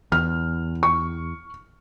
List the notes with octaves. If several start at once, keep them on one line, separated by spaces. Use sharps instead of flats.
E2 F6
C#6